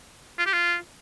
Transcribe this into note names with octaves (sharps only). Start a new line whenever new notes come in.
F4
G4
F4